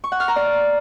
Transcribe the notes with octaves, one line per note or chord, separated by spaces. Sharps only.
C#6
F#5
F6
A#5
D5